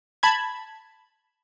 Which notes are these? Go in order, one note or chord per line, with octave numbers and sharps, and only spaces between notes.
A5 B5 G#6